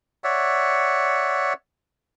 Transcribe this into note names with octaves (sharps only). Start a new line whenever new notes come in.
C#5 D5 E5 F#5